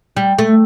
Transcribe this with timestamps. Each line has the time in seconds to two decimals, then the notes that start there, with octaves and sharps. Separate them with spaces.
0.17 G3
0.39 A3